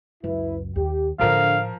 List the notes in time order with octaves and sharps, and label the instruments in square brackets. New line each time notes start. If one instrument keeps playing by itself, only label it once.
[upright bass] C#2 F#2 [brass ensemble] E4 B4
[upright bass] D#2 [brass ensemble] G4
[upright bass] A2 F4 [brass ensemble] D3 [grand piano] F3 A#4 [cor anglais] F5